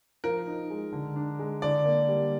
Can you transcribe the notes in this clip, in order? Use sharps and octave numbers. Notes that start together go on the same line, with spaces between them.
F3 A#4
D#4
G#3
D3
D4
G#3
D3 D5
A#3
G3